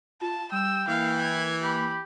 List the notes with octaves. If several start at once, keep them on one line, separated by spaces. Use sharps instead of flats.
F4 A5
G3 G5 E6
E3 A#3 F5
G#6
G4 B5